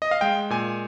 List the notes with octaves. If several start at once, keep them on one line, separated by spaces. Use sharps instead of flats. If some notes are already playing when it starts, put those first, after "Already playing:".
D#5
F5
G#3 G5
A#2 G#5